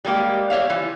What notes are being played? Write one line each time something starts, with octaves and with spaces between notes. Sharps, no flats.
G3 G#3 A#3 G4
G4 C#5 E5 F5
E3 F3